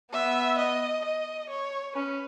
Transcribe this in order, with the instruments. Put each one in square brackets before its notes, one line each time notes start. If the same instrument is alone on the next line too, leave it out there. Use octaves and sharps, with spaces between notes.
[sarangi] B3 [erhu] E5
[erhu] D#5
D#5
C#5
[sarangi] C#4 [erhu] B4